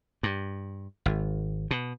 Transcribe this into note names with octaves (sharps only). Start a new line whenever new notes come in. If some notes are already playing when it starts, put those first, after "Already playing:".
G2
G#1
B2